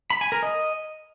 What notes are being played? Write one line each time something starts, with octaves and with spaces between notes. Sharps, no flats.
B5
G#5
A#4
D#5